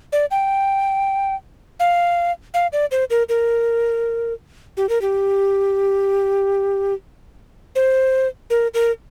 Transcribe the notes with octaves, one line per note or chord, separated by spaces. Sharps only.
D5
G5
F5
F5
D5
C5
A#4
A#4
G4
A#4
G4
C5
A#4
A#4